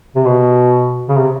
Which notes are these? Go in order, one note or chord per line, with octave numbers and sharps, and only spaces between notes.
C3
B2
C#3
C3